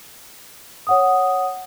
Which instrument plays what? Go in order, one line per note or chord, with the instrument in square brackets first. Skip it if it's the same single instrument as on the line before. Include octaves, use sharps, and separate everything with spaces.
[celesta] C#5 F#5 D#6